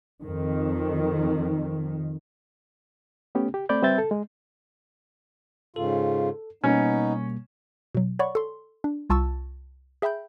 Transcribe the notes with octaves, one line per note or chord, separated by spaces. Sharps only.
F2 D#3
A3 B3 C#4 G4
G4
A3 C4 D5 B5 G6
G3 C4 B4 E5 G6 A6
A4
G#3
G#2 C#3 F4 A4
B2 G3 A#3 B3 C#4 D#4
B2 F#3
C#5 D5 F#5 B5 C#6
A4 C6
D4
C2 F4 A5 C#6 E6 A6
G#4 E5 G5 B5 G6